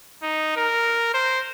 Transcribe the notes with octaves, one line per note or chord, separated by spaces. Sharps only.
D#4
A#4
C5